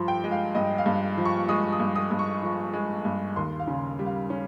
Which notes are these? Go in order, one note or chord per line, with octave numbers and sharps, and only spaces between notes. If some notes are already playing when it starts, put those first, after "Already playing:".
Already playing: G2 F3 C6
G5
G#3
F5
G2 D#5
F5
G2
F3
C#6
G#3 D#6
D#6
G2
D#6
G2
C#6
F3
G#3
G2
D#2 C6
F5
C#3
G3
F5
C#4